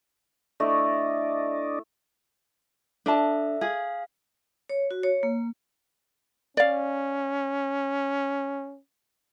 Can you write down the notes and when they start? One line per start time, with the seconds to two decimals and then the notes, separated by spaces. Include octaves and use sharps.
0.60 A3 D4 E4 D5 D#5
3.06 D4 A4 E5 A5
3.61 G#4 F5
4.70 C#5
4.91 F#4
5.03 C#5
5.23 A#3
6.57 C#4 D5 F5